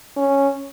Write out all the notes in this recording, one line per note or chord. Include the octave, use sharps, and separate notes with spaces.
C#4